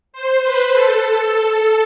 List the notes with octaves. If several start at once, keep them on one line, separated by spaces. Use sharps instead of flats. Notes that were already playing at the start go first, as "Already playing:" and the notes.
C5
B4
A4
A4